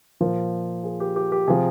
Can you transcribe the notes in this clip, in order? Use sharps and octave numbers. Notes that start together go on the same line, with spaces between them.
A#2 F3 A#4
G#4
G4
G4
G4
C3 F3 G#4